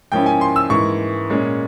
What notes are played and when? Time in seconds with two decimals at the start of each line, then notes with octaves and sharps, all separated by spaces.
0.12 G#2 F3 A#3 C#4 E4 G5
0.26 G#5
0.41 C6
0.56 E6
0.70 G#2 E3 A#3 C#6
1.30 A#2 G#3 C#4